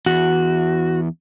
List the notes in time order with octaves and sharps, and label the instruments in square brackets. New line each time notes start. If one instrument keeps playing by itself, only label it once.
[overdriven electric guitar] E2 [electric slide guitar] F#4